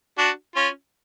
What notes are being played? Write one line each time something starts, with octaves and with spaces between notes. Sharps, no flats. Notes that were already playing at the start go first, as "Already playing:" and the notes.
D4 F#4
C#4 F4